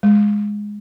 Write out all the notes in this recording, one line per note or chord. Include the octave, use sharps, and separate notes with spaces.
G#3